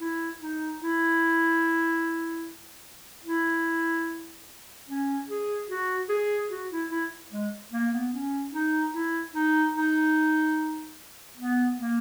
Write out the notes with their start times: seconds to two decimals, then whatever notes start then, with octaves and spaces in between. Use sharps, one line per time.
0.01 E4
0.40 D#4
0.82 E4
3.25 E4
4.88 C#4
5.28 G#4
5.68 F#4
6.09 G#4
6.50 F#4
6.71 E4
6.91 E4
7.32 G#3
7.72 A#3
7.93 B3
8.13 C#4
8.53 D#4
8.94 E4
9.35 D#4
9.75 D#4
11.37 B3
11.78 A#3